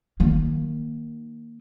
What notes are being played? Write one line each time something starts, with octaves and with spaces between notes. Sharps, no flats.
D#3 A#3